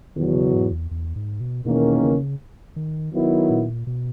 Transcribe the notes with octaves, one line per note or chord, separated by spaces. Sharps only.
E2 B2 D#3 F#3
C#3
G#2
E2
E2
G#2
B2
E2 B2 D#3 A#3 C#4
C#3
D#3
D#3 F#3 B3 E4
A#2
B2